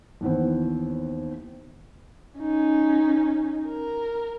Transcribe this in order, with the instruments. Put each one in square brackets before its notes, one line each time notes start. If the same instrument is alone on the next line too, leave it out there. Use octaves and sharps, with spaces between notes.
[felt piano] D#2 E3 B3 C4
[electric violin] C#4 D#4
A#4